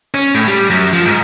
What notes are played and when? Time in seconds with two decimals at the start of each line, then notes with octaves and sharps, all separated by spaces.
0.14 C#4
0.35 A2
0.48 G3
0.70 F#2
0.93 F3
1.05 G#2